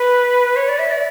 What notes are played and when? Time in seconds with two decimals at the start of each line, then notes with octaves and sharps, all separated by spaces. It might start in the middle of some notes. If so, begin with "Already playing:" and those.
Already playing: B4
0.56 C#5
0.68 D5
0.79 E5
0.91 D5